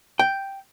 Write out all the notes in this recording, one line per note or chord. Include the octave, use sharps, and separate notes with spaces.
G5